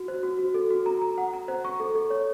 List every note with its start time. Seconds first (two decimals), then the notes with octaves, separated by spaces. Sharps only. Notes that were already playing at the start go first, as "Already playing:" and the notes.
Already playing: F#4
0.08 C5
0.23 F#4
0.39 F#4
0.54 A4
0.70 F#4
0.86 A#5
1.02 A#5
1.18 F#5
1.33 A#5
1.48 C5
1.65 C#6
1.80 A4
1.95 A4
2.10 C#5